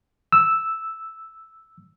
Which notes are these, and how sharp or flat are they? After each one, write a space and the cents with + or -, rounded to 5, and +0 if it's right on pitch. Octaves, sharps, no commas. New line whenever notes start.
E6 -5